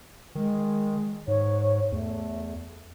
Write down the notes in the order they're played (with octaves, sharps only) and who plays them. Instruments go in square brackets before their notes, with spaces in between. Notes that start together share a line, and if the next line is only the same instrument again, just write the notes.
[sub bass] D#3 [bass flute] G#3
[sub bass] G#2 [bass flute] C#5
[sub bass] E2 [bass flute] A3